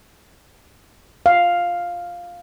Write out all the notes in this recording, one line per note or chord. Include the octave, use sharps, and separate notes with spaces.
F5